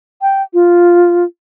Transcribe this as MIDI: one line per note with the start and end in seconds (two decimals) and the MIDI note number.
0.22 0.42 79
0.54 1.24 65